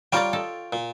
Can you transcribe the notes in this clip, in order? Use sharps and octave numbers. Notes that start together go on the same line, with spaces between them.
G3 F4 A#4 C#5 D5 G5
A4 D#5 A5
A#2